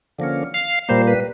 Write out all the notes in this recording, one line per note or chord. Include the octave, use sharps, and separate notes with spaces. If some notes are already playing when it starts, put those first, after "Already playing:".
D3 F3 A#3 C#4
F5
A#2 G3 A#3 C5
B4